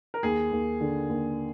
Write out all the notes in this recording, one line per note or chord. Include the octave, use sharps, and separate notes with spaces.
A#4
D#2 G#4
D#2
D3
D#2